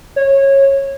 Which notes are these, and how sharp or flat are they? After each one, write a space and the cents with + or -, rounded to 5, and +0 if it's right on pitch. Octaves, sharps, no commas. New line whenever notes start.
C#5 -20